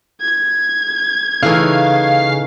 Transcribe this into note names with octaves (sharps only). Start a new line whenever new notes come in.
G#6
C#3 E3 A3 D#4 F5